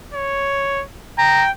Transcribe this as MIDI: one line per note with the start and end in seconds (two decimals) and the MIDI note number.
0.14 0.83 73
1.18 1.50 79
1.18 1.43 82